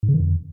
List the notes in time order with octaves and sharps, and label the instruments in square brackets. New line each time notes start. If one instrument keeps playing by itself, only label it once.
[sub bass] G#2
C#3
D#3
F2